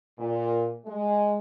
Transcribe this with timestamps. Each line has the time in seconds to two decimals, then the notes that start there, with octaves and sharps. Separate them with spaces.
0.19 A#2
0.86 G#3